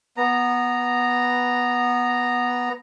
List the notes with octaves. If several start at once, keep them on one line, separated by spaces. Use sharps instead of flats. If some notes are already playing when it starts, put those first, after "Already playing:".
B3 A#5